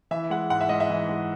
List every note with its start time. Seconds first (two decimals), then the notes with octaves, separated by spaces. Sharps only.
0.11 E3 E5
0.30 G#3 F#5
0.50 G#2 F#5
0.61 E5
0.69 G#2 D#5
0.80 E5
0.90 E3
1.09 G#3